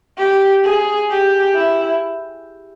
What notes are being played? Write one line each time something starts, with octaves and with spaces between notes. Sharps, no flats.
G4
G#4
G4
E4